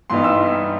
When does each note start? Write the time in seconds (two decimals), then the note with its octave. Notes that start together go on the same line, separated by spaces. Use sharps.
0.10 G2 E3 G3 B3 D#4 C6
0.24 E6